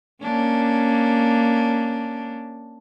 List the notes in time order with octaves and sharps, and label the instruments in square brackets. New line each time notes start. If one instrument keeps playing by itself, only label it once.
[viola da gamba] A#3 C#4 D4